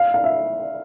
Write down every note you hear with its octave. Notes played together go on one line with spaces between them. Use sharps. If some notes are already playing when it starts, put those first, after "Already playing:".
Already playing: F5
F5
E5